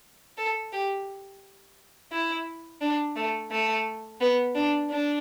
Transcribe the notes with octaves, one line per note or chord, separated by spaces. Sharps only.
A4
G4
E4
D4
A3
A3
B3
D4
D4